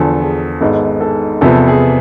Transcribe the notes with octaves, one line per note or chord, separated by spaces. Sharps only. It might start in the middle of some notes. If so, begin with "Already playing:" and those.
Already playing: E2 D3 F3 A4
G#4
G#1 G#2 G#3 B3 A4
A4
E2 C3 F3 B3 A4
G#4